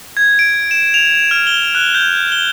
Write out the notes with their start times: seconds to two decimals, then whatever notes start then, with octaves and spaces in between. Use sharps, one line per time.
0.17 G#6
0.39 D7
0.71 E7
0.94 F7
1.31 F6
1.47 G7
1.75 F#6
1.95 G6
2.32 G7